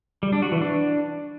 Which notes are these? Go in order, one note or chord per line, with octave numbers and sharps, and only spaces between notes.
G3
D4
F#4
E3
D4